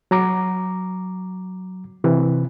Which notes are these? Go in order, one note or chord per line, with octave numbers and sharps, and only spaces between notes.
F#3 A#5 D6
C3 E3